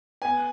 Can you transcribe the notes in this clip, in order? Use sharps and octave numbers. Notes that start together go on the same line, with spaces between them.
B3 G#5